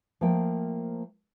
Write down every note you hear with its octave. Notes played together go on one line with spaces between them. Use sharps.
F3 A3 A#3 G5